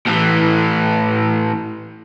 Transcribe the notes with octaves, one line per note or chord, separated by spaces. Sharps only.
A2 E3